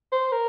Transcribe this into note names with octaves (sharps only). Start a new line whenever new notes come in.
C5
A#4